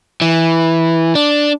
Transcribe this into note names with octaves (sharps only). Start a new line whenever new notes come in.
E3
D4